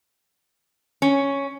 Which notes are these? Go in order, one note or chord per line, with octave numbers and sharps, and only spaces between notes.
C#4